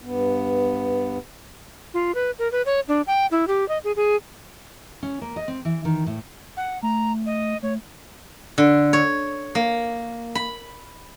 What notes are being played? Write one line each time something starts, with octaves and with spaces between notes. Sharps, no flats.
G2 B3
F4
B4
A#4
B4
C#5
D4
G5
E4
G4
D#5
G#4
G#4
C#4
A#3
D#5
C4
E3
D#3
A2
F#5
A3 A#5
D#5
A3 C#5
D3
C#5
A#3
B5